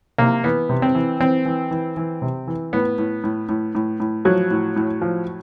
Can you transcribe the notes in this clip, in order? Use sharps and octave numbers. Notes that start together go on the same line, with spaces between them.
C3 A#3
E3 B3
C3
C4
E3
E3 C4
E3
E3
E3
C3
E3
A2 B3
A2
A2
A2
A2
A2
F3 F#3
A2
A2
F3